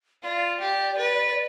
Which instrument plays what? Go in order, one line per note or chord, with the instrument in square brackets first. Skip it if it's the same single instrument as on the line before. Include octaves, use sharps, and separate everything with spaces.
[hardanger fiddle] F4 [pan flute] D5
[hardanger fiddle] G4
B4